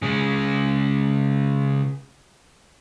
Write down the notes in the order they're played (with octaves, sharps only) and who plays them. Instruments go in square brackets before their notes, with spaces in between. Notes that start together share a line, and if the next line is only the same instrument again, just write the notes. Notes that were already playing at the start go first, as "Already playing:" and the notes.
[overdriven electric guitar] C#3 G#3